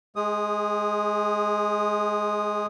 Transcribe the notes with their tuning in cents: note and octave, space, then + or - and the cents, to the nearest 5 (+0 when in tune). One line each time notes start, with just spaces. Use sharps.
G#3 +15 G#4 -25 D#6 -5